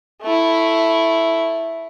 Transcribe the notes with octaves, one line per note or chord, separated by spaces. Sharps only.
A3 E4